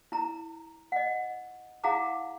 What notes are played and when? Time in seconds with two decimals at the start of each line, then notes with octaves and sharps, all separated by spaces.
0.12 E4 A#5
0.92 D#5 F#5
1.84 E4 G#4 F5 F#5 A#5 D6